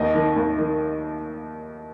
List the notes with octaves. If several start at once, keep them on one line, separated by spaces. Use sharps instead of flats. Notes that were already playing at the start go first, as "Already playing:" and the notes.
Already playing: D#2 D#5
D#3
D#2
D#3